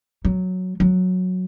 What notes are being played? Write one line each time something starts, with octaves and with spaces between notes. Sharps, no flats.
F#3
F#3